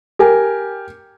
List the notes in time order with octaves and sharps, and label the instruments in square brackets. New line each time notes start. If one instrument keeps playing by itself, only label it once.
[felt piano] G4 A#4 G#5